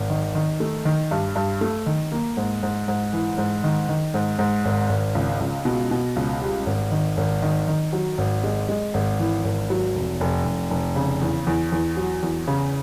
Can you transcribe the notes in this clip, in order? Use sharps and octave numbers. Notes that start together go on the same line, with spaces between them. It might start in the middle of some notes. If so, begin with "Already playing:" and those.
Already playing: G#1
D#3
D#3
A3
D#3
G2
G2
A3
D#3
A#3
G#2
G#2
G#2
E3
G#2
D#3
D#3
G#2
G#2
G#1
G#1
C#2
C#2
B2
B2
C#2
G3
G#1
D#3
G#1
D#3
D#3
F#3
G#1
G#3
G#3
G#1
E3
G#1
F#3
F1
F1
F1
F1
C#3
E2
E2
E2
F#3
E2
C#3